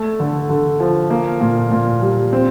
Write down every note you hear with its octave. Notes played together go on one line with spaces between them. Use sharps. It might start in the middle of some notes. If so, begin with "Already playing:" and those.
Already playing: A3
D3
D3
F3
A#3
A#2
A#2
G3
C4